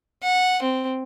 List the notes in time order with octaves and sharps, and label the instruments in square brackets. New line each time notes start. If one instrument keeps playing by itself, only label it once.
[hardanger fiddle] F#5
C4